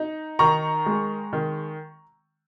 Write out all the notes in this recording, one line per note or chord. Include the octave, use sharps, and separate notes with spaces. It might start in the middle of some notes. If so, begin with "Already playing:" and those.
Already playing: D#4
D#3 A#5 C#6
G#3
D#3